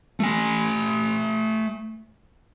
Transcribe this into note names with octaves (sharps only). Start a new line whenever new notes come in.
A3 G#5